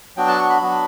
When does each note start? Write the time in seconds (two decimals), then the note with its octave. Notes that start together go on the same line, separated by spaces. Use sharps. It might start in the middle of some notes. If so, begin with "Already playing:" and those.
0.17 F#3 B3 D4 F#4 G5
0.28 A5
0.39 C#6
0.50 B5
0.61 F#3 B3 D4 F#4